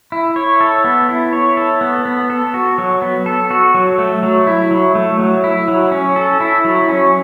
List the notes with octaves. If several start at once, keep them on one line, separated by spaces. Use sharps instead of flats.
E4
C#5
A4
B3
E4
C#5
A4
B3
B3
A4
F#4
F#3
B3
A4
F#4
F#3
A3
F#3
E4
F#3
A3
F#3
E4
F#3
C#4
A4
E4
F#3
C#4